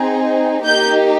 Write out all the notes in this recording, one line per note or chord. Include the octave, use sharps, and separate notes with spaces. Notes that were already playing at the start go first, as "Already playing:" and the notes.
Already playing: C4 D#4 G#4
A#3 D#4 G4 G6